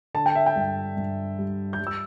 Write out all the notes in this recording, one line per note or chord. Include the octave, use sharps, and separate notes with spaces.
D3 A5
G5
E5
G5
G2
G2
G3
G6
G3
E6